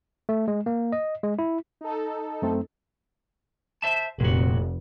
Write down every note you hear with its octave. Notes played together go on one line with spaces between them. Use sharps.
A3
G#3
A#3
D#5
G#3
E4
D#4 A4
F#2 A3 C4
C5 E5 A5
F1 A#2 F#4